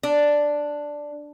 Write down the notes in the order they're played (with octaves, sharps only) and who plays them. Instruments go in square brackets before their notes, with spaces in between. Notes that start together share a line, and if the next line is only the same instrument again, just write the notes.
[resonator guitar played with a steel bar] D4